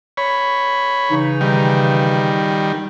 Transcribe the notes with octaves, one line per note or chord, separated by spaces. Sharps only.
C#5 B5
C#3 E3 D#4
D#3 G3